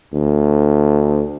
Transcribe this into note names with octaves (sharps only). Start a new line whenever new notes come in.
D2